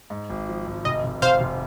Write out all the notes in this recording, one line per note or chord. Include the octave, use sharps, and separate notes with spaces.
G#2
G#1
F3
G#1
F1 D#5
F1
F1 C5 F5
F1